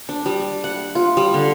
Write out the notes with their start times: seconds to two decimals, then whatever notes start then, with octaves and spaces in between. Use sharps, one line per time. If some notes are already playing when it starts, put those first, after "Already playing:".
0.09 D4
0.26 G3
0.64 F#5
0.95 F4
1.17 G3
1.34 D3